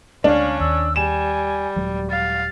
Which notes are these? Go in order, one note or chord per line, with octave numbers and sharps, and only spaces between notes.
D2 G#3 C#4 D4 F5
D#2 E6
G3 G#5 E7
D#1 F#3 G#3
F5 A6